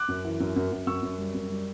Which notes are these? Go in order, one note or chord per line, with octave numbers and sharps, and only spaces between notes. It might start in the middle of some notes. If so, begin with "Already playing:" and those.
Already playing: D6 F#6
F#2
E3
F#2
F#2
F#2
F#2 C#6 E6
F#2
G3
F#2
G3